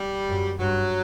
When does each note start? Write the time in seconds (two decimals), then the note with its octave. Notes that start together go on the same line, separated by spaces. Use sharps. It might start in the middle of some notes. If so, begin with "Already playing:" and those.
Already playing: G3
0.30 F#2
0.59 G2 F#3